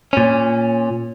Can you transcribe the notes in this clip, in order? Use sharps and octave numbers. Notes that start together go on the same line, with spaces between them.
A#2 C#4